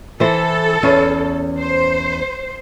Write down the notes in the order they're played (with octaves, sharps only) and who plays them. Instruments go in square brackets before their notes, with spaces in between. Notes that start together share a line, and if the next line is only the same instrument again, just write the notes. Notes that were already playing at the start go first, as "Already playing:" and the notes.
[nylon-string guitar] E3 C5 [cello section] A4
[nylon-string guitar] E2 C#4 C#5
[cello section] C5